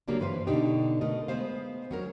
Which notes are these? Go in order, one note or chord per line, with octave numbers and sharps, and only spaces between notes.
C#3 F#3 G3 A#3 C#4 D4
G2 E3 G3 B4 C5 F5
B2 D3 D4 D#4 G4
B2 A3 A#4 D#5
G#3 B3 C5 F5
F#3 C#4 A#4